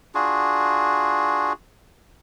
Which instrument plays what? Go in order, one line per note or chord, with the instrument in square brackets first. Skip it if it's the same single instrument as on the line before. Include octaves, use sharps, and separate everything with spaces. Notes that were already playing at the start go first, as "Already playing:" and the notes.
[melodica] D4 F4 F#4 G#4